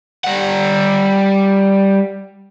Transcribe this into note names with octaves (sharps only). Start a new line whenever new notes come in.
G3 F#5